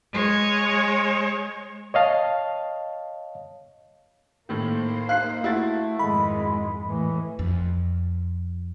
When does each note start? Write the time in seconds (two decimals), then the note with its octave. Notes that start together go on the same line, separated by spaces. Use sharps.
0.13 G#3 C#5
1.94 C#5 D#5 F5 A5
4.49 A2 D#3 A#3 C5
5.09 D#4 F5 F#6 C7
5.44 A3 E4 F#4 A6
5.99 F2 G#2 D#3 G#3 B5
6.87 A2 E3
7.39 F2